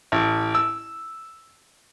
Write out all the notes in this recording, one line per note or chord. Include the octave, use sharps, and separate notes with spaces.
A1
E6